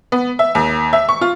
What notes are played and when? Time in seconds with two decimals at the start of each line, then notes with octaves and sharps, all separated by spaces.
0.12 B3
0.39 E5
0.55 D#2
0.93 E5
1.09 C#6
1.21 F4